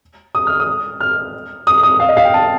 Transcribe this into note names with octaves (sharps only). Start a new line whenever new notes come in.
D#6
F6
D#6
F6
D#6
D#6
F5
D#5
F5
G5
A5